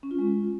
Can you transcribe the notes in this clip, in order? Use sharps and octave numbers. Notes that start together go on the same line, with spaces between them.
C#4
F4
G#3